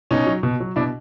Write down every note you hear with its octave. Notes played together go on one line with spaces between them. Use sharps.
B2 C#4 D#4
F#3
B2
F#3
B2 D4 E4